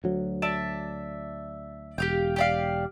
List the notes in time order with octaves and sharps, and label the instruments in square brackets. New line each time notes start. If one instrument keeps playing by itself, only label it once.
[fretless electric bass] D2 F#3
[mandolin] D5 E5 A5
[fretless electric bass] E1 [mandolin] G4 F5 G5
[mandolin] G4 D5 F5